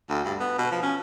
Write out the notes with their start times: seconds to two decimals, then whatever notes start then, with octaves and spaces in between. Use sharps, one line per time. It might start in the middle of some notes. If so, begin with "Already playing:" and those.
0.10 D2
0.25 G2
0.40 B3
0.58 B2
0.72 F3
0.83 C#4